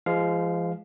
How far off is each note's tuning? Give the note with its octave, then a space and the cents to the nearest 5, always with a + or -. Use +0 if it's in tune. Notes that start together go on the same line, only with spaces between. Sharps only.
F3 -35 G#3 -5 F5 +0